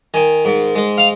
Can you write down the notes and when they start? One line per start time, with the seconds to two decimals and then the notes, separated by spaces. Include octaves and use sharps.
0.14 D#3 G#5
0.45 G#2
0.75 G#3
0.98 F5